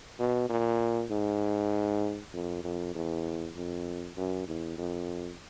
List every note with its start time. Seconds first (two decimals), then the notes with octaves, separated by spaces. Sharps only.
0.19 B2
0.50 A#2
1.11 G#2
2.33 F2
2.64 F2
2.95 E2
3.56 F2
4.17 F#2
4.47 E2
4.78 F2